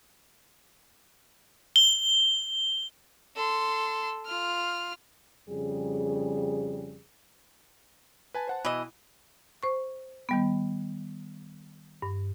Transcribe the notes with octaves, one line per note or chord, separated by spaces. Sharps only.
G7
A4 C6
F4 F6
F2 C#3 G3 G#4
B4 G#5 A5
C5 F#5 A5
B2 E3 E4 D#5
C5 C#6
D#3 G3 B3
G2